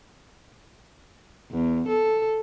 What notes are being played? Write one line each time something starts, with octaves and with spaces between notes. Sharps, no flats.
E2
A4